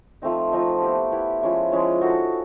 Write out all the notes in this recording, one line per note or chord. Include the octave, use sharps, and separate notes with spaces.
F3 A3 C4 D#4
F3 A3 C4 D#4
B3 E4 G4
B3 E4 G4
F3 G#3 C#4 E4
F3 G#3 C#4 E4
D#4 F#4 A4